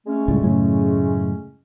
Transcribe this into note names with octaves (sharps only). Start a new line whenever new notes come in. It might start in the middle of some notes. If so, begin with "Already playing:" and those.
G#3 A3 C#4
C#2 A2 G3
F#2 A2 C#3